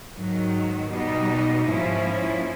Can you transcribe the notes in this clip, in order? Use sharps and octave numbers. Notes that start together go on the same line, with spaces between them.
G#2 D#3 F#3
B2 G3 B3 D#4
G#2 F3 A#3 C#4 E4